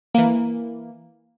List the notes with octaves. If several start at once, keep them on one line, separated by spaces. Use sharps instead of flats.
E3 A#3